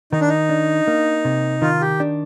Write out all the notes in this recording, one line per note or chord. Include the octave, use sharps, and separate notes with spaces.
D#3 D#4
D4
D#4
D4
A#3
C3
D#3 F4
G4
D4